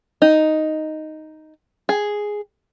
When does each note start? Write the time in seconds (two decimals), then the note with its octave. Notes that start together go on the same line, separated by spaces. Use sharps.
0.22 D#4
1.89 G#4